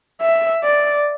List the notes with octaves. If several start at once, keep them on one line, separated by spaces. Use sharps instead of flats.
E5
D5